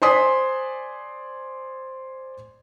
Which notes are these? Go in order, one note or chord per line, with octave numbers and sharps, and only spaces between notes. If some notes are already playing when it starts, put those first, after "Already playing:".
C5 D5 G#5 C6 D#6 B6